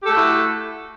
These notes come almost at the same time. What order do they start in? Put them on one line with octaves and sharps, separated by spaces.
G4 A4 A3 F#4 E4